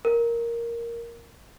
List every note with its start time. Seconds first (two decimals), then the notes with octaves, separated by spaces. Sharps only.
0.05 A#4